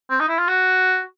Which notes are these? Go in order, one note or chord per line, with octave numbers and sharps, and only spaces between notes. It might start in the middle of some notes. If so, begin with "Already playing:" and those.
C4
D#4
E4
F4
F#4